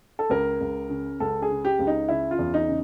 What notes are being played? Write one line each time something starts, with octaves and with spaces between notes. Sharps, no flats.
A4
C#2 A#4
C#2
C#3
C#2 A4
G#4
C#3
G4
C#2
D#4
C#3 E4
F4
E2
D#4
C#3